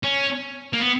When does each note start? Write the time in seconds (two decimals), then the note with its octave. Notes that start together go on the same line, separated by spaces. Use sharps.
0.03 C#4
0.73 A#3
0.80 B3